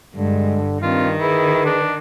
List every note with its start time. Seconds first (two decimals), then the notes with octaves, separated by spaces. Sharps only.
0.16 G2 D3 G#3
0.82 G2 D#3 C4 F4
1.20 E4 G#4 B4
1.66 D4